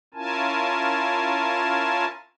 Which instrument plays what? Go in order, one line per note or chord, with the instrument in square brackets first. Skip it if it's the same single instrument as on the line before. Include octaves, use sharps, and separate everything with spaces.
[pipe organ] C#4 E4 F4 A#4 G#5 A5